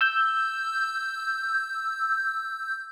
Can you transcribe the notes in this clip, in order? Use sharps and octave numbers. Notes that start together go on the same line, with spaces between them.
E6 G6